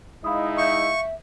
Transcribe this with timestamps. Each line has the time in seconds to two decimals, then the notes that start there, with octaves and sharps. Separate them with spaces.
0.24 G#3 D#4 E4 F5 B5 D#6
0.58 E5 F5 C#6 G6